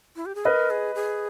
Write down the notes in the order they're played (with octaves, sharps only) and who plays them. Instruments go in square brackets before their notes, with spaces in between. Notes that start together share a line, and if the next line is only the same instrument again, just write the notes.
[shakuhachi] E4
G4
G#4
[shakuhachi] A#4 [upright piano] B4 D#5
[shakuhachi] G#4
G#4